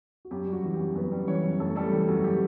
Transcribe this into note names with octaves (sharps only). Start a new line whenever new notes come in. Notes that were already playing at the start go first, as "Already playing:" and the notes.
F#4
F#2 G4
G3
F#4
E3
G4
F#2
F#2 B3 B4
G3
E3 C#4 C#5
F#2
F#2 A3 A4
G3 A3 A4
E3 G4
F#2 F#4
G4